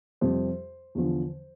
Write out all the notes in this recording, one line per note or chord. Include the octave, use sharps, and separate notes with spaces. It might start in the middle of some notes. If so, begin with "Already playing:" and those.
F2 C3 G3 C5
E2 D3 F3